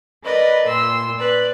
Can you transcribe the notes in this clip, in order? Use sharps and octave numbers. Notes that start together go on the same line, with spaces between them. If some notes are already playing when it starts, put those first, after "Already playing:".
A#4 B4 D5 D#5
A#2 C6 E6
B4 D5